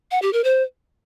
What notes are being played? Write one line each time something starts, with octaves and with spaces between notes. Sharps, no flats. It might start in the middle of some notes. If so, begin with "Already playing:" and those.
F#5
G4
A#4
C5